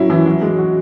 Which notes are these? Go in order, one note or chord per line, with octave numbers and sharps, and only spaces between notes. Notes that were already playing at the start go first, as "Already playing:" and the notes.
Already playing: F#3 C#4 E4
E3
F#3
G#3
F#4